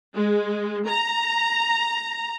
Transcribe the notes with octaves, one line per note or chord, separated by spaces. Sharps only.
G#3
A#5